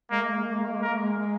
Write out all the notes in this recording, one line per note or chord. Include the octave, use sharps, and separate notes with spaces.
G#3 A#3
A#3
G#3
A#3
G#3
A#3
G#3
A#4
A#3
G#3
G#3